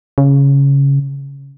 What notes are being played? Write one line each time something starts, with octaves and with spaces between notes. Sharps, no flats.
C#3